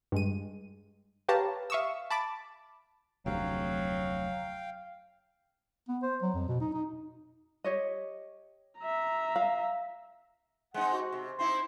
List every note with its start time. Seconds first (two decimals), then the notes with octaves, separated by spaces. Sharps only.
0.12 G2 G#3 D#7
1.29 G4 B4 C#5 F5 A5 A#5
1.70 E5 F5 C#6 D#6 E6
2.11 A5 B5 D6 A6
3.26 F1 D2 C3 F#3 F5 G5
5.88 B3
6.03 C5
6.22 F#3
6.34 F2
6.48 B2
6.61 D#4
6.73 D#4
7.64 G4 C#5 D#5
8.80 E5 A#5
9.36 F5
10.74 G#3 C4 D#4 F#5
10.93 F#4
11.12 C3
11.39 C4 D#4 E4 C6